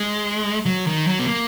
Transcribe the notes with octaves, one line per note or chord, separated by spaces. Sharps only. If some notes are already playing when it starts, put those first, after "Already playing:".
Already playing: G#3
F#3
D#3
F#3
B3
A#3